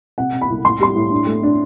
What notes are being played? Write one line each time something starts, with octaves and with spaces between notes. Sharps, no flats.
C3 F#5
C3
B5
C2
A2 C6
G3 C6
A2
D4
A3
D4